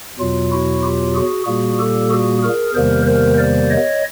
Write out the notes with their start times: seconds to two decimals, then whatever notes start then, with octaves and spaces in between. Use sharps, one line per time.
0.19 E2 B2 F#3 F4
0.51 E4 F#4
0.83 F4 G4
1.15 F#4 G#4
1.47 A#2 G3 A#3 F#4 G#4
1.79 G4 A4
2.10 F#4 G#4
2.42 G#4 A#4
2.74 E2 C3 D#3 G3 A#3 A#4 C5
3.06 A#4 C5
3.38 C5 D5
3.70 C#5 D#5